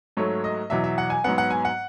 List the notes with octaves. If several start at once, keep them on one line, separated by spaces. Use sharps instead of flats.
G#2 F#3 A3 C#5
D#5
E2 B2 F#3 E5
E5
F#5
G#5
G#2 F#3 B3 F#5
F#5
G#5
F#5